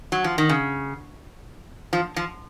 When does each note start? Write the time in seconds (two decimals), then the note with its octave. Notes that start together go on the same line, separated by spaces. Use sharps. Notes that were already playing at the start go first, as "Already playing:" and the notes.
0.12 F#3
0.24 F3
0.38 D#3
0.49 C#3
1.93 F3
2.16 F3